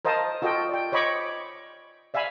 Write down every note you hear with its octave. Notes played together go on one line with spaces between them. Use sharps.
A#4 C5 D#5 F5 A5 D#6
F4 F#4 A4 D#5 G5
D5 G5
C5 C#5 D#5 B5 C#6 D6
D5 E5 F5 G#5 B5